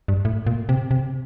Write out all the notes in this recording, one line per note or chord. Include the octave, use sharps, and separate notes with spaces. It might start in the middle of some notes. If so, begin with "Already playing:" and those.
G2
A2
A#2
C3
C3